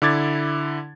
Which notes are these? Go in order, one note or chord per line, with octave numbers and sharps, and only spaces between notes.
D3 E4 D6 G#6 A6